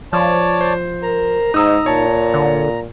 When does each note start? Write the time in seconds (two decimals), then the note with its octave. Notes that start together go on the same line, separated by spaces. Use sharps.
0.13 F3 C#5 D5 A5
0.61 C5
1.03 A#4 A#5
1.54 G#2 D#4 D#6 E6
1.86 A#2 C#5 A5
2.34 D3